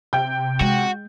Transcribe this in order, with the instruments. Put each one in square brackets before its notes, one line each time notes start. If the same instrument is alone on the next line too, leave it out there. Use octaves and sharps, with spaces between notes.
[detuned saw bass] C3 [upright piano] G5 G6
[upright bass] G#3 [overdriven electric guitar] F#4